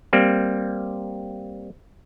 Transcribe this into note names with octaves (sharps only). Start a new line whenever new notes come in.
G3 A#3 C4